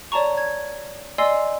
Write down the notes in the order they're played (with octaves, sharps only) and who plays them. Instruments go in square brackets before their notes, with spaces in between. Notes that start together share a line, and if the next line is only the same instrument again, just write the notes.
[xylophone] C#5 D5 A5 A#5 C#6
G#6
D5 D#5 G#5 C6 E6 C7